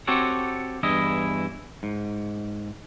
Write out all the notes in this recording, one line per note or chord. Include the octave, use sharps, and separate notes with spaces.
C4 F#4 G4 A4 C#5 F#5
E2 G2 E3 E4 D#5
G#2